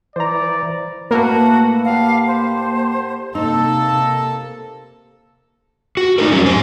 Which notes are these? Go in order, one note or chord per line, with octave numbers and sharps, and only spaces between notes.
E3 C5 D5 A#5
A2 A#3 F#4 A4 B4
G4 D5 F5 F#5
C5
C3 A#3 D#4 A4 A5 E6
F#4
A3 D#4 A4 A#4
E2 E3 F#3 G3 C#4
G#3 C5